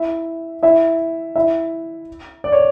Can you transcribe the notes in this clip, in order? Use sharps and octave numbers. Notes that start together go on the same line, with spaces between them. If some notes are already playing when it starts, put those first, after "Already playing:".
Already playing: E4 E5
E4 E5
E4 E5
D5
C#5